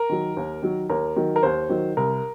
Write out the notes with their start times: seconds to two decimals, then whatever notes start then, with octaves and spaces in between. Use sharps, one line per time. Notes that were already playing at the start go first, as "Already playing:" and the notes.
Already playing: A#4
0.10 D#3 F#3
0.37 D#2
0.62 D#3 F#3
0.89 D#2 A#4
1.16 D#3 F#3
1.36 A#4
1.43 D#2 C5
1.69 D#3 F#3
1.97 C2 A#4